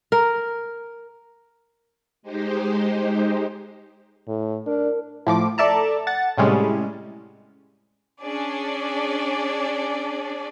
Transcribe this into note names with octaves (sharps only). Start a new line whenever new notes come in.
A#4
G#3 D#4 G4 C5
A2
D4 A#4
A2 F3 D6
A4 D5 E5 A5 A#5
F#5 A6
A2 C3 G3 G#3 C#4
C#4 D4 G#4 D5